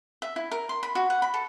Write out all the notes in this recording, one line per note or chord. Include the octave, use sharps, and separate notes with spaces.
E5
E4
A#4
C6
B5
F#4
F#5
B5
A4